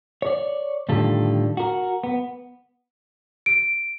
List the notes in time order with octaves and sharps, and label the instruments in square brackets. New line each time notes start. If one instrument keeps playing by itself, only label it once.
[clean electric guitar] C#5 D5
A2 D3 D#3 G3 F4 A4
F#4 A#4
B3
[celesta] D7